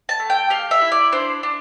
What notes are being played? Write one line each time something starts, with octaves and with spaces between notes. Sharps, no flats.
A5
A3
G5
G4 F5
E5
E4
D5
D4 C5
D4